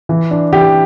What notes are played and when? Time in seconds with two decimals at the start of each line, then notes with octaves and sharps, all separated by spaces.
0.09 E3
0.31 D4
0.52 E3 G4